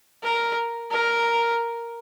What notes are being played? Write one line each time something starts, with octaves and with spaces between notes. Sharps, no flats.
A#4
A#4